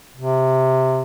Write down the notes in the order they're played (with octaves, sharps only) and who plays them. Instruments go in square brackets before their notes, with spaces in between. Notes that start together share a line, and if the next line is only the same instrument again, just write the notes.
[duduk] C3